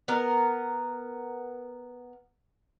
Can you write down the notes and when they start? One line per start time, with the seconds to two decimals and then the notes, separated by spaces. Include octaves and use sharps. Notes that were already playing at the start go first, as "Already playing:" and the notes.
0.08 B3 A#4